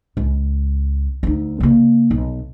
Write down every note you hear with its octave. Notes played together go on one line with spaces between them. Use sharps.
C#2
D2 D#4
C#3 A#3
B1